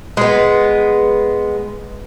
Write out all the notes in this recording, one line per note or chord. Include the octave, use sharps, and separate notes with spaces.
G#3 B3